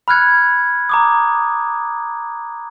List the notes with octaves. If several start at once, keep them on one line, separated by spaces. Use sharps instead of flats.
B5 F6 F#6 G#6 C#7
A#5 D6 D#6